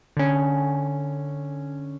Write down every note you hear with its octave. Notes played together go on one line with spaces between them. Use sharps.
D3 C#4